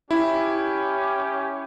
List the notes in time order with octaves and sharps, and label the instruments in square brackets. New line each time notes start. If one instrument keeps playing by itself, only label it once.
[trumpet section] C#4 G4 [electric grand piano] E4